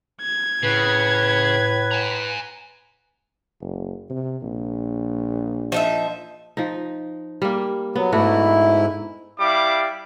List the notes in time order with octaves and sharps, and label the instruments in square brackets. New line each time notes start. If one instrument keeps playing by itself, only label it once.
[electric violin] G#6
[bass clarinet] A2 [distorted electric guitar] C#3 [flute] B4
[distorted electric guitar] G#5 A#5
[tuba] F#1
C3
A#1
[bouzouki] F3 D#4 E5
[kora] F3 D#4
G3 A#3
[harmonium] F#3 [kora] B3
[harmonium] G#2 E4 [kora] A3 D4 F#4
[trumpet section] G3 E4 F5 D6